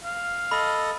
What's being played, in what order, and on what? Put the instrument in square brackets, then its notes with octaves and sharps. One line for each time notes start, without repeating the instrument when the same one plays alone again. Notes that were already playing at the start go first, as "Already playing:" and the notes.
[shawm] F5
[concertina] A4 D#5 [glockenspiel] B5